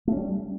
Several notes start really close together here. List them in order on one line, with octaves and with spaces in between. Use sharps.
A3 C#4 G3